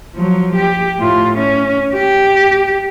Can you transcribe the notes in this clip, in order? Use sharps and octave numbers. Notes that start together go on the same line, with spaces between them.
F3 F#3
G4
A2 F4
C#4
G4